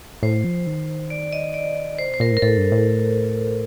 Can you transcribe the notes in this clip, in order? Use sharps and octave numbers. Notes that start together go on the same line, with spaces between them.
A2 C5
F3
D#3
D5
D#5
D5
D3 C5
C3 C5
A#2 A#4
A2
A#4
A2 A4
G2
A2